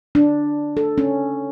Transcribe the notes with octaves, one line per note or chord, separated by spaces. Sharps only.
D4
A4
C#4